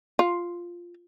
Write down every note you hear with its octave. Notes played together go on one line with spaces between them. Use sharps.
F4